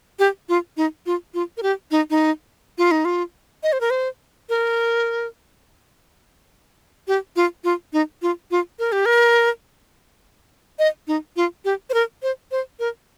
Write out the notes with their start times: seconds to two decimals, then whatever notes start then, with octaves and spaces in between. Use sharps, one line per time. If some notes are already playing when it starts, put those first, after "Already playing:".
0.19 G4
0.49 F4
0.77 D#4
1.06 F4
1.34 F4
1.57 A#4
1.63 G4
1.91 D#4
2.10 D#4
2.78 F4
2.91 D#4
3.05 F4
3.63 D#5
3.73 C5
3.81 A#4
3.90 C5
4.49 A#4
7.08 G4
7.36 F4
7.64 F4
7.93 D#4
8.22 F4
8.51 F4
8.79 A#4
8.92 G4
9.06 A#4
10.79 D#5
11.08 D#4
11.36 F4
11.65 G4
11.90 C5
11.94 A#4
12.23 C5
12.51 C5
12.80 A#4